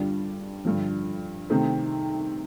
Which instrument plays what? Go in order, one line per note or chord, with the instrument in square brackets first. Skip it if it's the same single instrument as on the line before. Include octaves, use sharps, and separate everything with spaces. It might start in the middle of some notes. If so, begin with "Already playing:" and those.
Already playing: [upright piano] G2 D3 G3 D4 F4
G2 D3 F3
C3 D#3 A3 C4